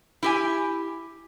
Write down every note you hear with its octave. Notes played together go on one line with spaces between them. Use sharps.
E4 G4 G#5